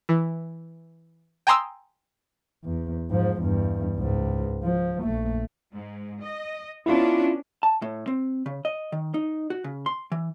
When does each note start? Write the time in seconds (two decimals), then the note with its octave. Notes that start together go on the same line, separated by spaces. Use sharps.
0.09 E3
1.47 G5 G#5 A#5 C6 D#6 E6
2.64 E2
3.10 G#2 F3
3.42 E2 G2
3.96 C#2 G#2
4.63 F3
5.03 A#1 A3
5.74 G#2
6.22 D#5
6.86 B3 C#4 D4 E4 F4
7.63 A5
7.82 A2
8.07 C4
8.46 C#3
8.65 D#5
8.92 D#3
9.14 D#4
9.50 F#4
9.64 C#3
9.86 C6
10.12 E3